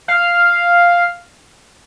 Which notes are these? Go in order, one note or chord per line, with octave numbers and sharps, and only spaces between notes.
F5